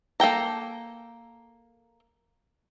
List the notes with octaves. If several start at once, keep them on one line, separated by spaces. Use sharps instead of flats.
A#3 A4 G5 A#5